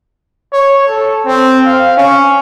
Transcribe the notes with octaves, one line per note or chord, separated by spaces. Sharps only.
C#5
A4
C4
F5
C#4